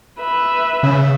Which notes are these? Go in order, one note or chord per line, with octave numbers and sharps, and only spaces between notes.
B4 E5
C#3